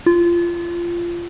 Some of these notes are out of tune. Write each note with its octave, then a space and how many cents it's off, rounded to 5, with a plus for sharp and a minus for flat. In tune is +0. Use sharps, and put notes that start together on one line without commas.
F4 -20